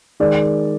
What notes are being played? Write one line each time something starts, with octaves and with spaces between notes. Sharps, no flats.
D#3 G#3 D5